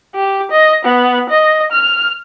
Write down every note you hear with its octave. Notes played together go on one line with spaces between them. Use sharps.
G4
D#5
B3
D#5
F6